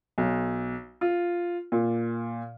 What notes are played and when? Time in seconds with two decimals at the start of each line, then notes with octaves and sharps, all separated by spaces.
0.18 B1
1.01 F4
1.72 A#2